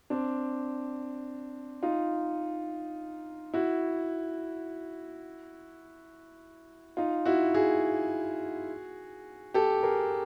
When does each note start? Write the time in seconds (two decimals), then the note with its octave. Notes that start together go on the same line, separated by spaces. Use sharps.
0.10 C4 D4
1.83 D#4 F4
3.54 E4 F#4
6.97 D#4 F4
7.26 E4 F#4
7.54 F#4 G#4
9.54 G4 A4
9.83 G#4 A#4